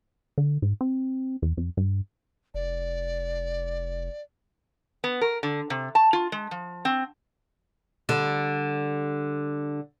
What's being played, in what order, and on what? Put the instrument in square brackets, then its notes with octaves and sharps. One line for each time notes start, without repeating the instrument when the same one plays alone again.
[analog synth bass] D3
G#2
C4
E2
F2
G2
[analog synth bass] F1 [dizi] D5
[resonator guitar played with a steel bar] B3
A#4
D3
C3
A5
F4
G#3
F3
C4
[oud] D3 G3